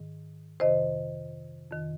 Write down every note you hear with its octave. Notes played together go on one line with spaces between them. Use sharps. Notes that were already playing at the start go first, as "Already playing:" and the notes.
Already playing: G#2 D#3
F2 C3 D#3 C5 D#5
F2 D#3